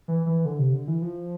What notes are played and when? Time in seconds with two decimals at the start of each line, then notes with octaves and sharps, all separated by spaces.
0.08 E3
0.26 E3
0.45 D3
0.59 C3
0.73 D3
0.88 E3
1.02 F3